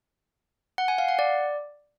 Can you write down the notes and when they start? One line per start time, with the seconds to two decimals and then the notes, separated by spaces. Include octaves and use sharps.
0.78 F#5
0.88 G#5
0.98 F5
1.09 F#5
1.19 D5